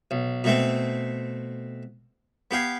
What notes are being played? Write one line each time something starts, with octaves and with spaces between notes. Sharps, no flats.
B1
B2 A3 C4
B3 G4 F5 G#5